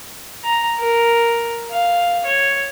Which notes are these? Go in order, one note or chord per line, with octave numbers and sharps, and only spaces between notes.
A#5
A#4
F5
C#5